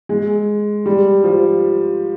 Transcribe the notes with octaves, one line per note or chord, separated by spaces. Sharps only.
G#3
G3
F3